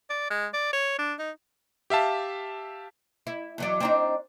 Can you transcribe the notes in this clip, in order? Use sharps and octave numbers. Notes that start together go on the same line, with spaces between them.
D5
G#3
D5
C#5
D4
D#4
G4 E5 F5 A5
E4
E2 F#3 D5
C4 D4 D#4